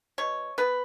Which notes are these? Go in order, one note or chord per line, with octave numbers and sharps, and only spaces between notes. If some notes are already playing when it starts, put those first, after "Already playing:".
B2 C#5
B3 B4